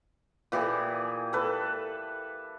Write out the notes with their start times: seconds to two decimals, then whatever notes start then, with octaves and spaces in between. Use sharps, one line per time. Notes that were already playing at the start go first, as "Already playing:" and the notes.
0.52 A#2 E3 G4 G#4
1.33 A4 B4